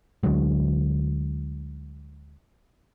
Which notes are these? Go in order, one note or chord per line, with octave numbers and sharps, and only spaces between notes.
D2 D3 F#3 G#3